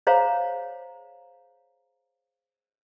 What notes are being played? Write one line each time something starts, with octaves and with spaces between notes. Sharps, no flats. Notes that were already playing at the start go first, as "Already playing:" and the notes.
G#4 C5 C#5 F5 A#5